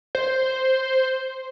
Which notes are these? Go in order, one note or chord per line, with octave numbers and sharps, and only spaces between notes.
C5